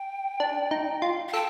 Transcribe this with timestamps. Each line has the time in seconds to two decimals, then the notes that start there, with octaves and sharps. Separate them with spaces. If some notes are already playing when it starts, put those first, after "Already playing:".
Already playing: G5
0.40 D4
0.71 D#4
1.02 F4
1.29 F5
1.33 A4 G5